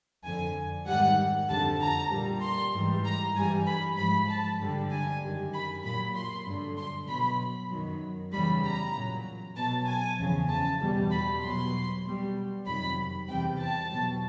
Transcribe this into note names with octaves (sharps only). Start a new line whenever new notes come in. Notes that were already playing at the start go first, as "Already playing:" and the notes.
F2 D3 F3 G#5
G#2 D#3 G3 F#5
F2 D3 G3 A5
A#5
A#2 G3
C6
G#2 E3 G3
A#5
G2 E3 G3 G#5
B5
G#2 F3 B5
A5
G2 D3 G3
G#5
F#2 D#3 G3
B5
A#2 F#3 B5
C6
G2 D3 F#3
C6
B2 F#3 B5
F#2 D#3 F#3
E2 C#3 E3 G3 B5
A#5
A#2 F#3
B2 F#3 A5
G#5
E2 C#3 F3
A5
E2 B2 G3
B5
B2 F#3 C6
B2 G3
F2 C3 D#3 F#3 B5
E2 C3 E3 G3 G5
A5
B2 F#3